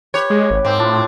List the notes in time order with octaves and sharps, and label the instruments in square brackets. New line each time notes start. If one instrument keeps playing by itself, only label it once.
[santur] G4 B4 [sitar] C#5
[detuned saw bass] G#3
G#1
[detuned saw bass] G#2 [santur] A#3 [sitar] C4
[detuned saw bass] A2 [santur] F3 D4 E4